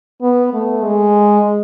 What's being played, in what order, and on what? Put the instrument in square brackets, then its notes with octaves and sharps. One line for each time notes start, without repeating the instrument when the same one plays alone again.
[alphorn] B3
A3
G#3